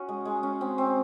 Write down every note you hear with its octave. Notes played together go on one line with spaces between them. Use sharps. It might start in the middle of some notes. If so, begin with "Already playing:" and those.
Already playing: C#4 F#4
G#3
G#3
C#4
C4
C4